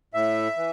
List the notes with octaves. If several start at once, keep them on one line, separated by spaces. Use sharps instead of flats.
A2 E5
E3